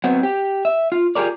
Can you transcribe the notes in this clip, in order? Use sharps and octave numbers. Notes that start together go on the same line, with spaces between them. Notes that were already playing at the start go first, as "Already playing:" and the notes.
F#3 B3 C4
G4
E5
F4
F4 G4 G#4 A#4 D5